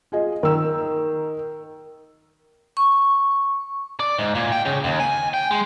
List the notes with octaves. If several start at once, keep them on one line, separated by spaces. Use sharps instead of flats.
F4 G#4 D#5
D#3 A#4 E6
C#6
D5
G#2
A#2
G5
C#3
D#2
G#5
G5
G#3